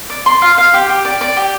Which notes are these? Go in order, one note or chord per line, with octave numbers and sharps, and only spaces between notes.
D5
C6
F5
F5
G4
G4
D5
D5
G4